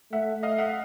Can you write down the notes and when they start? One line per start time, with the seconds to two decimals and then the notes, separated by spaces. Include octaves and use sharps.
0.12 A3 E5 F#5
0.43 A3 D#5 F5
0.59 E5 F#5